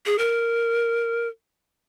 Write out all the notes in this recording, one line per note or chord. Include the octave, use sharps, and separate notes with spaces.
G#4
A#4